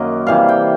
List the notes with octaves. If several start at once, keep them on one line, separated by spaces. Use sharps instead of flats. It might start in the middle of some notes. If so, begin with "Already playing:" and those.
Already playing: F#2 D#3 F#3 A#3 D#5
C3 E3 G3 F5
G5